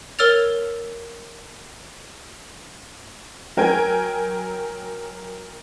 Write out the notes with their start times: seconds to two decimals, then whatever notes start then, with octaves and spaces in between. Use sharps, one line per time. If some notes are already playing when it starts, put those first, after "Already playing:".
0.19 A#4 C#5 E6 F6 A6 F7
3.57 F#3 A#4 G5 G#5 G#6